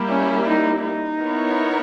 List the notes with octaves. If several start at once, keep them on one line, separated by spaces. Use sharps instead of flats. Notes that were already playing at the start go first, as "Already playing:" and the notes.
Already playing: G3 A#3 E4 G4
C#4
D#4
D#4
B3 E4 A#4 C#5